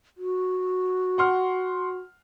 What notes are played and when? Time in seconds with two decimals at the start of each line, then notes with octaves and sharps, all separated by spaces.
0.17 F#4
1.18 F#5 C6 F6